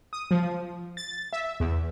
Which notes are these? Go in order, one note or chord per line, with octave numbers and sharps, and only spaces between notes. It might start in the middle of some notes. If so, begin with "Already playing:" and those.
D#6
F3
A6
E5
E2